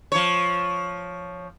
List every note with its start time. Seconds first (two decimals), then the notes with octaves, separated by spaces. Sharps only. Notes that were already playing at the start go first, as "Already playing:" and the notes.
0.12 F3 C#5